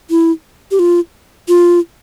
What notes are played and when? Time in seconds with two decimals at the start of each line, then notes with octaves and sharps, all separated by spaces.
0.10 E4
0.71 G4
0.79 F4
1.48 F4